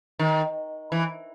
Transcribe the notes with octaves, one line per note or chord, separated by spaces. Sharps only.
D#3
E3